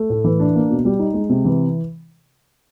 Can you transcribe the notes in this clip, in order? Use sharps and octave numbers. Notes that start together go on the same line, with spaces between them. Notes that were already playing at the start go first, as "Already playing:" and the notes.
Already playing: A3
A2
E3
D4
A#3
B2
G3
D#4
G#3
C3
E3